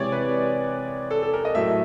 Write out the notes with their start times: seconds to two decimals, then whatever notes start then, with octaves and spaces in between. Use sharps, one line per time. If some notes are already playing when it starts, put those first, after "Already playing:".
Already playing: C3 E3 G#3 C#5 D5
0.12 B4
1.11 A4
1.23 A4
1.34 A#4
1.45 D#5
1.55 A2 F#3 A3 E5